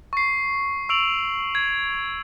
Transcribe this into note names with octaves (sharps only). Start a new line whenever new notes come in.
C#6 C7
C#6 E6 D7 F7 F#7
G#6